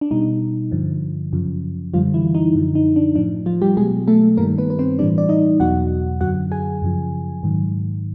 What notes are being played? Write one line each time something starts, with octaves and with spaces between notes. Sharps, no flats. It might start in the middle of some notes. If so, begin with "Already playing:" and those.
D4
B2 G3 D#4
G2 D3 F3
F#2 C#3 F3
F#2 D3 F3 G3 F4
E3 E4
D#4
F#2 D3 F3
D#4
D4
A2 F3 D4
F3 F4
G3 G4
B2 F#3 G#3 G#4
A3 A4
G2 D#3 G3 A#3 A#4
B3 B4
B4
C4 C5
A2 E3 G3 D4 D5
D5
D#4 D#5
E2 B2 F#3 F#4 F#5
F#2 D3 F#3 F#4 F#5
G#4 G#5
F#2 C#3 F3
G#2 D#3 F#3